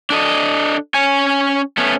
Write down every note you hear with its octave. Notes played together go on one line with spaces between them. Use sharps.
D4 A4 D#5
C#4 G#5
A3 B3 C#4